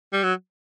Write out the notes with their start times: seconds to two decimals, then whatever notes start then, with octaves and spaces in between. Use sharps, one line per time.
0.13 G3
0.23 F#3